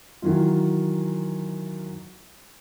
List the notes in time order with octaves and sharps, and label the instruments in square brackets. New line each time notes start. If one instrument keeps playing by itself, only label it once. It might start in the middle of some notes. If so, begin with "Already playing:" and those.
[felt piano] D#3 E3 F#3 F4